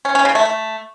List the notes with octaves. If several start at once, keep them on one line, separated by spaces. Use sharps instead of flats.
C#4
C#4
C#3
A3
A3